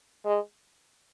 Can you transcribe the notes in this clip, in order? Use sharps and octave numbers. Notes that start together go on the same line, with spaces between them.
G#3